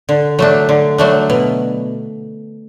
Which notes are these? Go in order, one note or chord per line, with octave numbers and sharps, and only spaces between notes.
D3
F#3 A3 D4
D3
F#3 A3 D4
B2